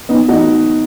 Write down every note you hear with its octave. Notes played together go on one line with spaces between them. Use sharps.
B3 D#4
D#4 F#4